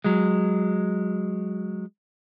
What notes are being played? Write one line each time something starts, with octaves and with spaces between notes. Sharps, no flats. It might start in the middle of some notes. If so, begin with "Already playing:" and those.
F#3 G#3